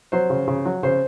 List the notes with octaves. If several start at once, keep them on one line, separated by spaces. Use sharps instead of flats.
F#3 C5
C#3
C#3
F#3
C#3 C5